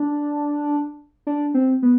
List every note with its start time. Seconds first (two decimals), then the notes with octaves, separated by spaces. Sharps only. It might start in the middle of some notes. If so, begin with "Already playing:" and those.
Already playing: D4
1.27 D4
1.54 C4
1.82 B3